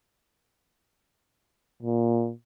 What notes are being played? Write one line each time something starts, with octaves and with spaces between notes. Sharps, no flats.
A#2